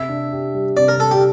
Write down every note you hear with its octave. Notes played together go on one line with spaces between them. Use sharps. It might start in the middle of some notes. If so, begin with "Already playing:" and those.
Already playing: C3 E5
D4
G4
G3
C3 D5
A#4
D4 A4
G4